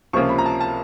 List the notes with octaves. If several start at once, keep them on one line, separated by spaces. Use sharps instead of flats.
C#2 C3 F3 A#3 C#4 C#6
B5
A#5
A5
A5